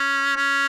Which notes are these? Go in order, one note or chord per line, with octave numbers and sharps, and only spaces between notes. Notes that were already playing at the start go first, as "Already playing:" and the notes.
Already playing: C#4
C#4